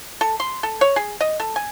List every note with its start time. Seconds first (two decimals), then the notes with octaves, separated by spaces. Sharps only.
0.21 A4
0.40 C6
0.63 A4
0.81 C#5
0.96 G#4
1.21 D#5
1.40 A4
1.56 G#5